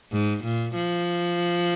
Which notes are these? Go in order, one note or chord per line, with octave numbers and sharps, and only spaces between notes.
G#2
A#2
F3